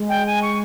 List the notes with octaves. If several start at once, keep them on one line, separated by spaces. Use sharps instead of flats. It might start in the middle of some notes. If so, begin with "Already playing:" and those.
Already playing: G#3
G5
G#5
C#6